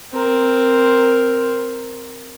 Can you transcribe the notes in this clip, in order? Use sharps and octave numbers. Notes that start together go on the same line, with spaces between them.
C4 A#4